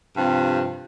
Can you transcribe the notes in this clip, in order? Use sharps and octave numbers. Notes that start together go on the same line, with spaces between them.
G2 C3 F3